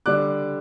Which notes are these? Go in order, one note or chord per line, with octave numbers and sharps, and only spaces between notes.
D3 G3 D4 D6 F#6